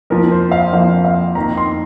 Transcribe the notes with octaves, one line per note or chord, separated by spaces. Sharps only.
F2 F3 A#3 A#4
C5
F5
F2 F3 A#3 F5
F5
F2 D#3 A#3 A#5
C6